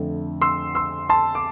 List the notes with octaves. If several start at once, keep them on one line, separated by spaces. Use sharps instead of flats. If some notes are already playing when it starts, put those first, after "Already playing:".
Already playing: F2 D3 A3
C6 E6
C6 E6
A5 C6
D6